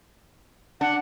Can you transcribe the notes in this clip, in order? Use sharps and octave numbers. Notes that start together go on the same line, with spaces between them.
D4 F#5